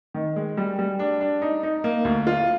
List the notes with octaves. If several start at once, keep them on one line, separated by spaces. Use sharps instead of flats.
D#3
G#3
G3
G3
D4
D4
D#4
D#4
A#3
D2
F4